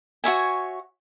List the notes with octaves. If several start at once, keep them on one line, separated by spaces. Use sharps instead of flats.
F#4 C#5 E5 G#5